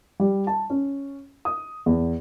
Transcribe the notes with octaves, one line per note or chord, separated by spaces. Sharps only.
G3
A5
C#4
D#6
E2